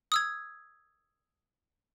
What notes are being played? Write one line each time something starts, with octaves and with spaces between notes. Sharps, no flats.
D#6 E6 G#6